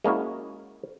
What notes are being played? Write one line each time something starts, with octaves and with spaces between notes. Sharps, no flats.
G#3 A#3 C#4 E4 F#4